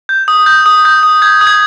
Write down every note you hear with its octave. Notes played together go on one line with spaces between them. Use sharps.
G6
D#6
G6
D#6
G6
D#6
G6 G#6
D#6
G#6